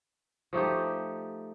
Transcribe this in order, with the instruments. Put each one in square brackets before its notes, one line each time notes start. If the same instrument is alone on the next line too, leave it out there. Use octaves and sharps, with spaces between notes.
[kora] F3 A3 D#4 G4